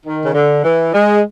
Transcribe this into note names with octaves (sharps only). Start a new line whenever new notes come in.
D#3
C#3
D3
E3
G#3